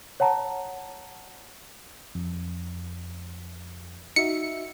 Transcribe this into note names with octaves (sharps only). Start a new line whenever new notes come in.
C#5 F#5 A5 A#5
F2
D#4 F#4 E5 C#7